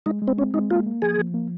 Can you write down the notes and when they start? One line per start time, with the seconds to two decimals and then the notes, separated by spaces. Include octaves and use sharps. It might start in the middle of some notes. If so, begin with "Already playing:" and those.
0.06 G#3 D#4
0.22 G#3
0.28 C4
0.38 C4 C#4
0.54 G#3 D#4
0.70 A#3 F4
0.86 A#3
1.02 F3 G#4
1.18 F3
1.34 A#3